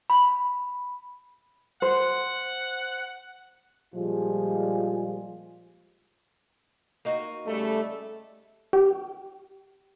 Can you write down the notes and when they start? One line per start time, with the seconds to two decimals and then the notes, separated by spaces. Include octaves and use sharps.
0.10 B5
1.82 C5 F#5
3.94 A#2 F3 G3 G#3 F4 G#4
7.05 A#3 D#4 F#4
7.46 C#3 G3 A3
8.73 G4